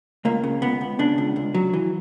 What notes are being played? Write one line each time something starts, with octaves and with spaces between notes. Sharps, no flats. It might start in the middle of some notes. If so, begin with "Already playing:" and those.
C#2 A#3
C#3
C#2 B3
C#2
C#3 D4
C#2
C#2
F#3
E3